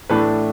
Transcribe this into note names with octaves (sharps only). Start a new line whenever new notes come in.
A2 E3 A3 D4 B4